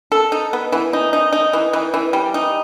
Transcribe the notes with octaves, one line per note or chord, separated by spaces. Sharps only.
A4
D#4
B3
E3
D#4
D#4
D#4
E3
E3
E3
G3
D#4